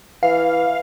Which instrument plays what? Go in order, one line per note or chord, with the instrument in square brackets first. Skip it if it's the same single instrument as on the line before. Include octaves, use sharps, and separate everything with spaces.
[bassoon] E3 [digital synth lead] F5